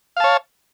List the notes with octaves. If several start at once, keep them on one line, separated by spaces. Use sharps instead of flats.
C#5 F5 A5